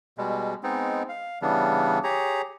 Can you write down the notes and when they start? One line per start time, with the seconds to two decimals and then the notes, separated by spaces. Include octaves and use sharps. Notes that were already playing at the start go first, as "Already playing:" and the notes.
0.18 B2 G3 G#3
0.63 G#3 B3 C4 D#4
1.09 F5
1.42 C#3 E3 G3 B3 D4
2.04 G4 G#4 C#5 A#5